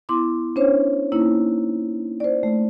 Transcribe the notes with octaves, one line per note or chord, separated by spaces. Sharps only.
B3 E4 C6 D6
C#4 D4 C5 C#5
A#3 C#4 D#4 E4
C5 D5
A3